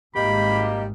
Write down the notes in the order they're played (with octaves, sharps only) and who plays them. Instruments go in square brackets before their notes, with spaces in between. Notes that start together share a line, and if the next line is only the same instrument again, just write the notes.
[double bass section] G#1 G#2 D#3 [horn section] G3 A#3 G4 [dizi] D#5 [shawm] B5